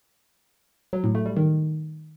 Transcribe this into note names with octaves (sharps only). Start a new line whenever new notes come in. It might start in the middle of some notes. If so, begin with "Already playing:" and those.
F#3
A2
A3
G3
D#3